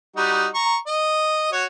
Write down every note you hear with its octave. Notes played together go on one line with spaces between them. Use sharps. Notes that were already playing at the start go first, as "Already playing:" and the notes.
G3 D#4 F#4
A#5 C#6
D#5
F#4 C#5